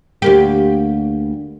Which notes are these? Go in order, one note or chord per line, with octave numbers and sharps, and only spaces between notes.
D2 A#3 G4